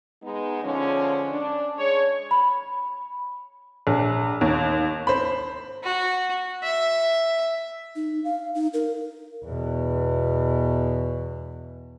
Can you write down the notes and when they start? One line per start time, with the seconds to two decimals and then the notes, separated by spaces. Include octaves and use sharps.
0.22 G#3 B3 D#4
0.62 D3 F3 G#3 C#4
1.29 D4
1.76 G#3 C#5
2.31 B5
3.87 A#1
4.41 D#2
5.07 C5 B5
5.84 F#4
6.63 E5
7.96 D#4
8.24 F5
8.55 D#4
8.74 A#4
9.45 E2 B2